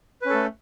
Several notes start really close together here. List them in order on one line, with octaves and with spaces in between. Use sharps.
B4 C#4 A4 A3